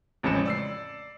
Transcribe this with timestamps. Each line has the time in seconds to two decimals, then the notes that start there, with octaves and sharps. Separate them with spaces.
0.23 A1 F2 C#3 G#3 C#7 E7
0.45 D5 E6 C7